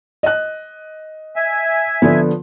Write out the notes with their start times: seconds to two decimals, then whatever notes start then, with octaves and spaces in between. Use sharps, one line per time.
0.23 D#5 F#6
1.36 E5 G#5
2.02 D3 F3 B3